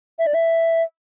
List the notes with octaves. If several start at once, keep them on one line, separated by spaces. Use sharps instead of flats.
E5
D5
E5